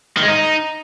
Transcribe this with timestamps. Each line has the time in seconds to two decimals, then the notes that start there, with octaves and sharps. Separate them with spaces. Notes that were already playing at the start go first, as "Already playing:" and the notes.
0.17 D#3
0.23 G#3
0.28 D#4